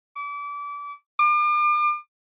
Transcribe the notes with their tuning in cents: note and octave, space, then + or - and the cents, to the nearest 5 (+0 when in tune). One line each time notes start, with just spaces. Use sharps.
D6 -30
D6 +40